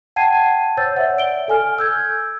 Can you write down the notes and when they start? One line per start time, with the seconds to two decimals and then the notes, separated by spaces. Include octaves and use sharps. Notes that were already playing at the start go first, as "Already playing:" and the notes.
0.16 F#5 G5 A5 G#6 C7 D#7
0.77 C5 C#5 E6 G6 A6
0.97 C#5 D5 E5 F#5
1.18 D7 G7
1.48 A4 G#5 F6
1.79 E6 G6 G#6